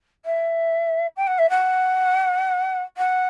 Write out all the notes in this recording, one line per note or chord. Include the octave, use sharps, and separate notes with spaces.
E5
G5
F#5
E5
F#5
F#5